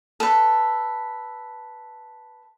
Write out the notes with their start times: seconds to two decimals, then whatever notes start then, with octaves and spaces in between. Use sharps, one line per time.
0.20 A4 B4